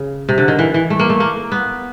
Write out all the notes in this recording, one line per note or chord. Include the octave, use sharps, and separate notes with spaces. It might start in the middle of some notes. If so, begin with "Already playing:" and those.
Already playing: C#3
C3
D3
D#3
E3
E3
A3
A#3
A3
A#3
B3